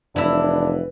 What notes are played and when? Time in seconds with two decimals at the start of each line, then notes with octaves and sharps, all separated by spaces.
0.16 F1 E3 D4 E4